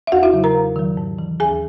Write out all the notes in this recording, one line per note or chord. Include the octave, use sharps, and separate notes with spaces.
E5
E2 F#4 F#5
E4 E5
C#3 F#3
A#4 A#5
E2
D#3 F#3
G#2
E3
D#2 G#4 G#5